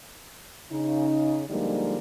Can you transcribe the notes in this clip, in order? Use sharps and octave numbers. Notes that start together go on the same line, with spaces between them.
C#3 D#4
D3 F3 G3 G#3 A#3 D#4